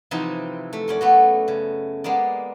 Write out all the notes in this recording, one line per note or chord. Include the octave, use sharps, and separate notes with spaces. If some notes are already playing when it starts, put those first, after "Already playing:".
C3 E3 F3 C4 D#4 E4
A3
F#2 C#4 D5
A3 B3 F#4
C#3
G#3 A#3 B3 D5